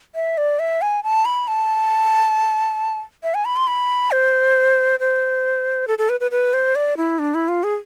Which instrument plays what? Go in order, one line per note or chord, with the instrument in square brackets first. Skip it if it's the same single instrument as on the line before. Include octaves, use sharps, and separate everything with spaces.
[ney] E5
D5
E5
G#5
A5
B5
A5
E5
G#5
B5
C6
B5
C5
C5
A4
A4
B4
B4
B4
C5
D5
E4
D4
E4
F4
G#4